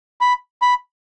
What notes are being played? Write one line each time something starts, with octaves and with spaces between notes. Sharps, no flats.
B5
B5